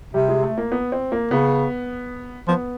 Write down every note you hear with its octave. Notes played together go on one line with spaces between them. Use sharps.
C3 G3
G#3
A3
A#3
B3
C4
A#3
C#3 B3
F3 B3